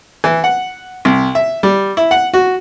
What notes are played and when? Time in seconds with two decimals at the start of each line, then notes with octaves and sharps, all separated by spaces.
0.24 E3
0.44 F#5
1.05 C2
1.35 E5
1.63 G3
1.97 E4
2.11 F#5
2.34 F#4